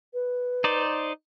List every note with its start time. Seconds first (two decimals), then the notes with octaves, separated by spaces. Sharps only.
0.14 B4
0.64 D#4 C5 D5